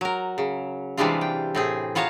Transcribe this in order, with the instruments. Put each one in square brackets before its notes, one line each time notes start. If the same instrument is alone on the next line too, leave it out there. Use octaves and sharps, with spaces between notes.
[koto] F#3 A#4
C#3
C3 E3 G3 G#3 D4 F4
G5
A2 C4 G#4
B3 F4 C#5 F5 A5 A#5